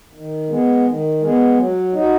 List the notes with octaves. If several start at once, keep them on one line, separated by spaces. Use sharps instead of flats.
D#3
G#3 B3
D#3
G#3 B3
F#3
D#4 F#4